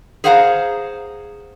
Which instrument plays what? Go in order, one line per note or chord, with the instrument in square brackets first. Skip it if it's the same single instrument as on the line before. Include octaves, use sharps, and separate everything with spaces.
[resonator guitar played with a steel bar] G#4 C5 F5 F#5 A5 A#5